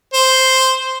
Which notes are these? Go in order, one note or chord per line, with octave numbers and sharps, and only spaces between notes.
C5